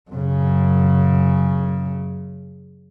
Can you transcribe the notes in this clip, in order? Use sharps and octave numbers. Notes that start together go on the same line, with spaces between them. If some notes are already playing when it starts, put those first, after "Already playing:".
F#2 C#3